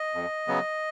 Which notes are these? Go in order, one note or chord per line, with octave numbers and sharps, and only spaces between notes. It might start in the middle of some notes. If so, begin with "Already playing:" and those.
Already playing: D#5
F2
C#3 F#3 B3